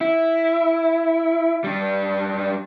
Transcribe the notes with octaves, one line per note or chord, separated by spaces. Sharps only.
E4
G3 D4